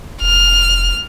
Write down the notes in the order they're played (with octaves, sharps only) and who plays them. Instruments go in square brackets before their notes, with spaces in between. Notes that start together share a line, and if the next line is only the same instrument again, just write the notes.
[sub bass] F1 [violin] F6